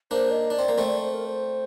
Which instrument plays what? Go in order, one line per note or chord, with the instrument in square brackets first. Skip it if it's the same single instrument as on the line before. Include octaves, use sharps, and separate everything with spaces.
[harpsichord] A#3 D4 [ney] C5
[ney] D#5
[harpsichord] D4 [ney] D5
[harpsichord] C4
A#3
A3 C4
[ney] D5
C5
A#4
C5